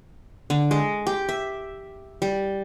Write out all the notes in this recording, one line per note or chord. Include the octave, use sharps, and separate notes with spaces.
D3
G#3
G4
E5
G3